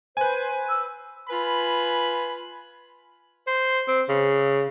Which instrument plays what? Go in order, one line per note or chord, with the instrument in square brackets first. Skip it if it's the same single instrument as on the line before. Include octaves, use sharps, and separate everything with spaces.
[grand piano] B4 G#5 [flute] C5
[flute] E6
[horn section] F4 B4 G#5 B5
[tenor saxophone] C5
C4
C#3